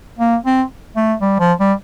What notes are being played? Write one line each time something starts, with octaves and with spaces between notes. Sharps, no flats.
A#3
C4
A3
G3
F3
G3